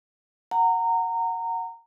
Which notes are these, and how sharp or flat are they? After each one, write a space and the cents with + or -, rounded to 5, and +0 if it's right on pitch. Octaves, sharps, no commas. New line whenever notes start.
F#5 +0 A#5 -20